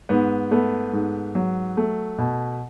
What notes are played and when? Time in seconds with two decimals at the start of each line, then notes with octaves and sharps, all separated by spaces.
0.09 G#2 B3
0.51 A3 B3
0.93 G#2
1.35 F#3
1.77 A3
2.18 B2